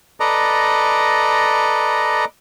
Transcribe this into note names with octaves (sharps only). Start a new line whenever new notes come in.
A4 B4 D5 D#5 A#5